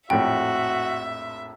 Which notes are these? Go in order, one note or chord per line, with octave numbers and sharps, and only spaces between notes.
A#1 F2 A2 F#4 E5 G5